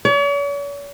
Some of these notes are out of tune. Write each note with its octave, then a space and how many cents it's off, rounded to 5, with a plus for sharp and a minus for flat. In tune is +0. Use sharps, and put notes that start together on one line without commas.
C#5 +45